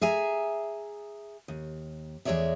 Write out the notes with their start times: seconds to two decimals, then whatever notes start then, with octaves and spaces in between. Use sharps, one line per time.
0.01 G#4 E5 G#5 A#5
1.48 D#2
2.25 E2 G#3 A4 C#5 D5 E5